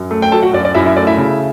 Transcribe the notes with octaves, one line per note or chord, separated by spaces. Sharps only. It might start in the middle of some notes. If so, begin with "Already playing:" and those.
Already playing: F#2
A3
G5
F#3 A4 A5
F#4 F#5
F#2 D5
D5
F#2 E4 E5
E4 E5
A3 D5
E4 E5
C#3